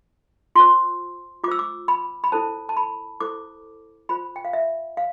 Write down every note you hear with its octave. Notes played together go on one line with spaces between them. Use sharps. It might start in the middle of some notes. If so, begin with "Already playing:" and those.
F4 C5 C6
F4 C5 D6 E6
D6
B5
B5
E4 A4 C5 A5
A5
B5
E4 A4 C5 D6
F4 C5 B5
G5
F5
E5
F5